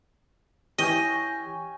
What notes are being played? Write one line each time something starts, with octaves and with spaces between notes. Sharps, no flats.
E3 C#4 G4 D#5 G5 G#5